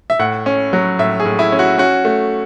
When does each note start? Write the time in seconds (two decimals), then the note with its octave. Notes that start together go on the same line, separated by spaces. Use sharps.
0.10 E5
0.19 A2 F#5
0.46 C#4
0.73 F#3
0.99 A2 E5
1.20 G#4
1.25 A2
1.39 E4
1.52 C#4
1.59 F#4
1.78 C#4 F#4
2.05 A3